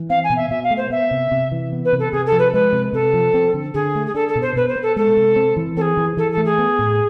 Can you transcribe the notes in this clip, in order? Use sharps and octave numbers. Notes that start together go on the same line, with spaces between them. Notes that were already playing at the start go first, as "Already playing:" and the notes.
Already playing: E3
C4 F5
G#5
B2
E5
B2 E5
F5
A3
C5
B3 E5
C3
C3
E3
B3
B4
C3
A4
C3 G#4
A4
F3
B4
G#3 B4
C3
C3 A4
F3
C4
D3
D3 G#4
A3
G#4
D4 A4
A4
B2
C5
B2 B4
C5
B3
A4
G#3 A4
C3
C4
E3
C4 G#4 A4
E3
E3 A4
A4
A3
G#4
B3
A2